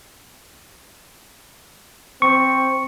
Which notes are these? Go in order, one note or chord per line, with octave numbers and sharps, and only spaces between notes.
C4 C#6